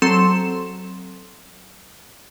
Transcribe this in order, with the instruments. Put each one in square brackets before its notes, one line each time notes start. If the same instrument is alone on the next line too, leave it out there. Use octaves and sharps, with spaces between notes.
[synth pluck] F#3 C4 A4 C6 E7